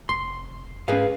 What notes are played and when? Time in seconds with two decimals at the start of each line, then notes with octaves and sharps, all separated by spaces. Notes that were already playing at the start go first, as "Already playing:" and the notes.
0.09 F1 C6
0.88 G#2 C#4 G#4 B4 F5